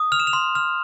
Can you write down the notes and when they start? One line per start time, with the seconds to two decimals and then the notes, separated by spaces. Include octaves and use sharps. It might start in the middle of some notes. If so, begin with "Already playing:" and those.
Already playing: D#6
0.12 F6 F7
0.20 E7
0.27 F7
0.33 C6
0.55 F6